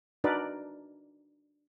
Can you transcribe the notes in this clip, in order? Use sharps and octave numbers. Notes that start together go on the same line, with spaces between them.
D4 D#4 F#4 A#4 B4 D5